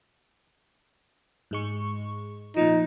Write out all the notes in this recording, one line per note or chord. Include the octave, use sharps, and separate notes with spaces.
G#2 G#3 C#6
A#2 F3 D#4